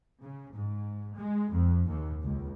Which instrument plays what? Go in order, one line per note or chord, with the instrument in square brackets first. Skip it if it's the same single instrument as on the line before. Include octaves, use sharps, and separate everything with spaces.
[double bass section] C#3
G#2
G#3
F2
D#2
C#2